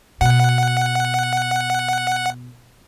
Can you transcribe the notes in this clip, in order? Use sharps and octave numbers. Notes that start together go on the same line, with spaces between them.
B2 F#5